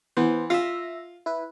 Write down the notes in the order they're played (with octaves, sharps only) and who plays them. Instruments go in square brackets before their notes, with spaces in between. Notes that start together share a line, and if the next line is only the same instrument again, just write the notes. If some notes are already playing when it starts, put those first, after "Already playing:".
[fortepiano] E3 [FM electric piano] B3 C5
[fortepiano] F4 [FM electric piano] E5 A#6
[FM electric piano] E4 B4